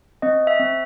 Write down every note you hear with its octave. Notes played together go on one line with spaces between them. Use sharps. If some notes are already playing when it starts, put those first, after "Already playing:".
C4 D#5
E5
C4